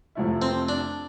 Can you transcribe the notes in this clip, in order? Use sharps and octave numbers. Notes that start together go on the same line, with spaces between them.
F2 C3 F3 A3 E4
C4
D4